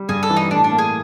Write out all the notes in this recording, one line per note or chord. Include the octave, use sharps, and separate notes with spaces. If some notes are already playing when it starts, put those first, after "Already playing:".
Already playing: G3
G2 G#4
A4
E3
D#4
A2 D4
D4
A#3
G#4